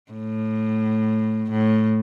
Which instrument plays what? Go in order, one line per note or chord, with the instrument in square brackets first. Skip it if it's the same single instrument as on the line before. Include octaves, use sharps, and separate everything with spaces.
[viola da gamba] A2
A2